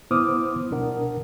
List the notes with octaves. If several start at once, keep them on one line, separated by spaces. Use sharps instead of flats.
B3 E4 C5 D6 D#6 F6
C2 B2 D4 A#4 F#5